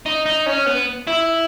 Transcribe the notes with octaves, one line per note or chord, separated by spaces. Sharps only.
D#4
D#4
C#4
B3
E4